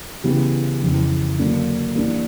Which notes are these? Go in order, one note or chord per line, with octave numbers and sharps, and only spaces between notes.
C#3 E3 G3 B3
F2 C#3 E3
D3 F#3 A#3 D4
E3 G3 A#3 D4